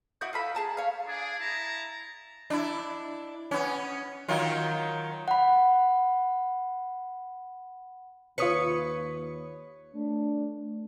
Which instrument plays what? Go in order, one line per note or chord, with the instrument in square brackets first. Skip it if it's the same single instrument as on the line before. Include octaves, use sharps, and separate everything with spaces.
[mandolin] E4 F#4 D#5 G6
F4 A4 B5
G#4 A5 A#5
C#5 F5
[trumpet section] D4 G#4
E4 A5 A#5
[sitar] D4 E4
B3 C#4
D#3 F#3 F4
[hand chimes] F#5 B5
[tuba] D#2 [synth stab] F4 D#6 C#7 [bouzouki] B4 C#5
[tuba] A3 [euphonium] D4